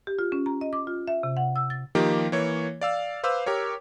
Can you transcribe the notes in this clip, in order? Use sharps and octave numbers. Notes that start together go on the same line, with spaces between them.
G4
F4
C#4
A#5
D#5
D6
F4
E5
C3
F#5
E6
A6
D#3 F3 A#3 D#4 G4
E3 A#3 C#5
D5 F5 E6
B4 C5 F5 D6 E6
G4 A#4 C#5